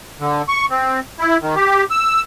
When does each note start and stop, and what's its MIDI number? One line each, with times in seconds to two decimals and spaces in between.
0.20 0.42 50
0.48 0.65 85
0.70 1.00 60
1.19 1.37 64
1.42 1.55 51
1.55 1.84 67
1.91 2.21 88